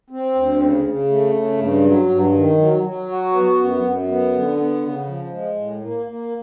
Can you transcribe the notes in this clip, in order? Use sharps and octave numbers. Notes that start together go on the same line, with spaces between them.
C4
D2
C#3
C#3
A3
C#3
G2
F#3
G2
D#3
F#3
F#3
F#4
B3
F#2
F#2
B3
D3
B3
C#3
F3
G#3
A2
A#3
A#3